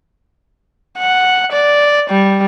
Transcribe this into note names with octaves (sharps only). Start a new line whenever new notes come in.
F#5
D5
G3